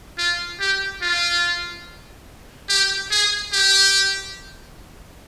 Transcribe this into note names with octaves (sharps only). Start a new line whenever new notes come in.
F4
G4
F4
G4
G#4
G4